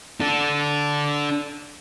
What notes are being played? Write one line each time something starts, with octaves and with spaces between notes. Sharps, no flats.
D4 A4